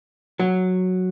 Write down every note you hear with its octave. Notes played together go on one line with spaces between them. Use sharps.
F#3